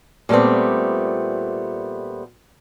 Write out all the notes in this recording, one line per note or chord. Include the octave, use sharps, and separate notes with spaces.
A#2 G3 A3 B3 C4